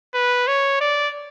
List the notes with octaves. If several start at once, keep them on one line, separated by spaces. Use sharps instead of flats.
B4
C#5
D5